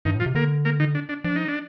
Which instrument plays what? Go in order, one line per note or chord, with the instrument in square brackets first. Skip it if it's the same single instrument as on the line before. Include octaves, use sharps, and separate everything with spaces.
[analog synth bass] G2 [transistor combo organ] D#3 D#4
[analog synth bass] A2
[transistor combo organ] F3 F4
[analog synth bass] C3
[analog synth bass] D3 [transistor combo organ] A#3 A#4
[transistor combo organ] A#3 A#4
D#3 D#4
D4
D4
[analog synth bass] F3 [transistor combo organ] D4
[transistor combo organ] D#4
D4